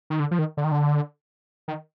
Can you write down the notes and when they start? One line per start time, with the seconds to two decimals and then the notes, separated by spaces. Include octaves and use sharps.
0.10 D#3
0.20 D3
0.31 F3
0.39 D#3
0.57 D3
0.64 D#3
0.72 D3
1.68 D#3